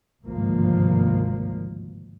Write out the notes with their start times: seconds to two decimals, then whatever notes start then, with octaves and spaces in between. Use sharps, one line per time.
0.24 G#1 D2 G2 C3 F3 A#3